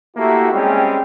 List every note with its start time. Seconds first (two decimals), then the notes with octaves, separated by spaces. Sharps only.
0.16 A3 A#3 E4 F#4 G4
0.52 G3 G#3 C4 C#4 G#4